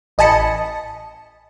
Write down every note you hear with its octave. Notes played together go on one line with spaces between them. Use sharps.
A1 D#5 G#5 A5 B5 C#7